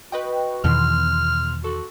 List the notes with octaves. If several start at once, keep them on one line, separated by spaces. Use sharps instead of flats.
F#4 B4 D#5 G5
E2 B2 D#3 E3 C6 F6
F#4 A4